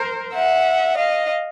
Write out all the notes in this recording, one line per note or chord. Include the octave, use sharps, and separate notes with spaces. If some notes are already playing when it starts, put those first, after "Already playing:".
Already playing: A#4 C5
E5 F#5
D#5 F5